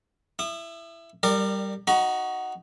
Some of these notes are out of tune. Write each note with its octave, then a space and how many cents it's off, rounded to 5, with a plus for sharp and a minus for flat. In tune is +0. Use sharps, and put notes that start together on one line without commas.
E4 +15 D#6 -40
G3 +0 A#4 -20 D5 +30
D#4 +0 F#4 +10 A#5 +35